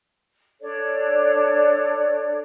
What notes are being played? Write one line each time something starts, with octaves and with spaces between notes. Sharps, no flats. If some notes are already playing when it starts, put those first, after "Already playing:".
D4 A4 C#5 D5